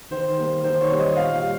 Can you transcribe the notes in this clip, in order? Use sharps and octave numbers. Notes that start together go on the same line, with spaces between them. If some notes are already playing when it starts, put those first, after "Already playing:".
D#3 C5
G3 A#3
D#3 C5
C#5
G3 A#3
D#5
A#2 F5
F5
G3